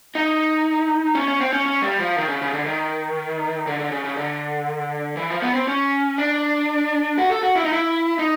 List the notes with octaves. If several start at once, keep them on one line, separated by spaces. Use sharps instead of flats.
D#4
C#4
C#4
C4
C#4
C#4
G3
F3
D#3
C#3
C#3
D3
D#3
D3
D3
C#3
C#3
D3
E3
F3
B3
C4
C#4
D4
F#4
A4
F#4
E4
D#4
E4
D#4